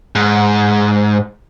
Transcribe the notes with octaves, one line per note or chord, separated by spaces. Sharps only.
G#2